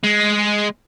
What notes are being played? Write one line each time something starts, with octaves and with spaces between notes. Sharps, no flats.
G#3